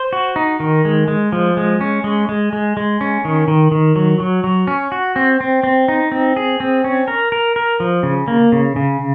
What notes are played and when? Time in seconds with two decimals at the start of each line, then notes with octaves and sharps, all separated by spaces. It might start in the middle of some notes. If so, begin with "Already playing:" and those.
Already playing: C5
0.13 F#4
0.36 D#4
0.60 D#3
0.85 G#3
1.08 G#3
1.32 F3
1.57 G#3
1.81 C#4
2.04 G#3
2.29 G#3
2.53 G#3
2.77 G#3
3.01 C#4
3.25 D#3
3.48 D#3
3.72 D#3
3.96 F#3
4.20 F#3
4.44 F#3
4.67 C#4
4.92 F#4
5.16 C4
5.41 C4
5.63 C4
5.88 D#4
6.12 C4
6.36 G#4
6.60 C4
6.84 C#4
7.08 A#4
7.32 A#4
7.56 A#4
7.80 F3
8.03 C#3
8.28 A#3
8.52 C#3
8.76 C#3